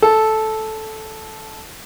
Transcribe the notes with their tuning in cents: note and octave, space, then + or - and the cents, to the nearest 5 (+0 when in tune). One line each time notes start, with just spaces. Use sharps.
A4 -10